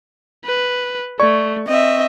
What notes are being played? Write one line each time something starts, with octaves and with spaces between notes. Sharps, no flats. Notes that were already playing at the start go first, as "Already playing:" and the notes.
B4
A3 D5 C#6
C4 D#5 E5